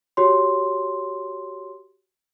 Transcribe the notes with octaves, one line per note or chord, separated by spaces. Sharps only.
F#4 G4 C#5 C6